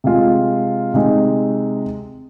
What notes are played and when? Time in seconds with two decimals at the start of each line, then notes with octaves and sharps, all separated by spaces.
0.04 C3 G#3 F4
0.94 C3 G#3 D#4